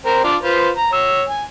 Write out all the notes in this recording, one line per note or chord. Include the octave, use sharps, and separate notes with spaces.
C4 A#4 C5
D4 F4 D5
F4 B4 C5
A#5
C#5 E6
G#5